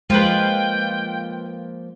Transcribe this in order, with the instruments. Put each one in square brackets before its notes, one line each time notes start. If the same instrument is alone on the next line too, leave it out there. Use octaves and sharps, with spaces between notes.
[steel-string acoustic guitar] F3 A#3 [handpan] G#3 [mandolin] F4 B4 [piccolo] G5